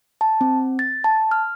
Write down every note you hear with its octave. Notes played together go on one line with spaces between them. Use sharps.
A5
C4
A6
A5
F6